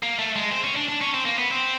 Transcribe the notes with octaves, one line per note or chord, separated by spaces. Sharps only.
A#3
A3
G#3
C4
C#4
D4
D4
C#4
C4
A#3
B3
C4